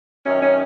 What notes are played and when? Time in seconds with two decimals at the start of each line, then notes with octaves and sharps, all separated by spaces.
0.25 F#2 D#3 C#4
0.42 C#4